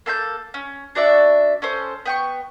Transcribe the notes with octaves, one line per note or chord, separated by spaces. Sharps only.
A#3 A4 B5 G6
C#4
D4 F#4 D5 E5
C#4 A4 C5
B3 G5 C#6